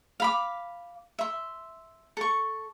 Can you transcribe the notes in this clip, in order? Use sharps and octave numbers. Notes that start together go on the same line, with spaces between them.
F5 B5 D6
E5 C6
A4 C#6